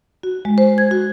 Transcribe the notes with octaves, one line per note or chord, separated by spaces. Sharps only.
F#4
G#3
C5
G#6
F#4